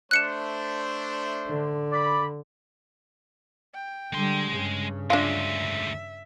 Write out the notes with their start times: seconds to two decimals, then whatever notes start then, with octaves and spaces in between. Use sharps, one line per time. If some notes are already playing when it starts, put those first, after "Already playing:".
0.11 A3 D4 C5 F#6 C#7 E7
1.49 D3
1.92 D5 B5
3.74 G5
4.13 D3 G3 G#3 C6
4.52 G2 C#3
5.10 D2 G#3 D4 F4 E5